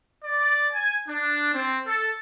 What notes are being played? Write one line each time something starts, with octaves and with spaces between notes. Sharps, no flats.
D5
G#5
D4
C4
A4